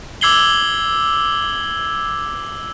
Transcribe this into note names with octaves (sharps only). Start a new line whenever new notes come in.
D6 E6 G#6 C7 F#7 G7